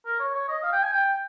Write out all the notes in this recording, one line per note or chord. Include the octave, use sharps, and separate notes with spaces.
A#4
C#5
C#5
D#5
F5
G5
G#5
G5